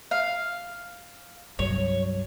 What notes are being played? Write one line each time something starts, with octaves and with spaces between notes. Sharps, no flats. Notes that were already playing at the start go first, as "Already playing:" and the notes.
F5
C2 G2 F#3 C#5